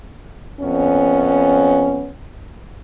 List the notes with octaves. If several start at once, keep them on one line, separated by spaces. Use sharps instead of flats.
F2 B3 C#4